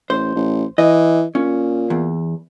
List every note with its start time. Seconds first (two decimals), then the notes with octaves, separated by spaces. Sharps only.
0.10 A1 C5
0.35 A1
0.78 E3 D#5
1.35 A#2 C#4
1.90 E2